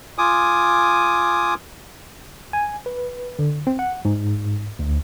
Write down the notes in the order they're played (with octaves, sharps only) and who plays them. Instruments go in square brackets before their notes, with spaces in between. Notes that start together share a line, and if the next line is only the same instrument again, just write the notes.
[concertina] F4 G#5 D6 D#6
[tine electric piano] G#5
B4
D3
C4
F#5
G#2
D2